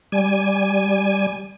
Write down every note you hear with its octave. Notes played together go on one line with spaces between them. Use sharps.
G3 G#5